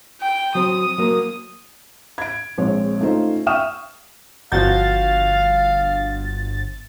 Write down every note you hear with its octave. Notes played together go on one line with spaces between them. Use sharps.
G5
F#3 C4 D#6
F#3 A#3
G#6 D7
A#1 G#3 C4 C#5
A3 C#4 D#4 F4 C5
E5 G5 C#6 D#6 F6 E7
G1 F3 F#4 F5 G6 A6